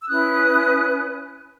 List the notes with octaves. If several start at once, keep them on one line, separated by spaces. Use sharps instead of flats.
E6
C#4 E4 B4 D#6 F#6